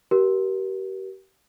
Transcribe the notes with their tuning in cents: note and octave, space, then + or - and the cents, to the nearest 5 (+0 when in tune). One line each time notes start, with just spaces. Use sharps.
G4 -35 A#4 +30